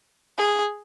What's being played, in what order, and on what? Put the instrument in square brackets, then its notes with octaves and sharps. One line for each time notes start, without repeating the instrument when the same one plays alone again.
[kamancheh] G#4